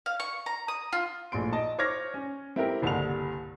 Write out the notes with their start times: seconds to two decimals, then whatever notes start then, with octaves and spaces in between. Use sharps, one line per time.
0.06 F5
0.20 C#6
0.46 A#5
0.68 D#6
0.93 F4
1.32 A#1 A2 C6 D7
1.53 D#5 A5
1.78 C5 C#5 D6 F6 G#6 A#6
2.14 C#4
2.56 C4 E4 G4 A#4
2.82 F#1 C2 G2 D3 F7